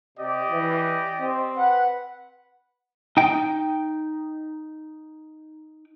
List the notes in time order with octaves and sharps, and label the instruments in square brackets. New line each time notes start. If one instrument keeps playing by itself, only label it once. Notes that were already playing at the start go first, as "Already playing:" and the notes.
[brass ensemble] C3 [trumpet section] G4 D5 D#5
[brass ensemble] E3
C4
[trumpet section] B4 F#5
[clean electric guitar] D#4 G5